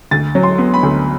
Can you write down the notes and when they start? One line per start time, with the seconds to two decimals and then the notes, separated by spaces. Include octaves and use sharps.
0.11 D2 A6
0.35 F#3
0.43 C6
0.58 B3
0.74 B5
0.83 D2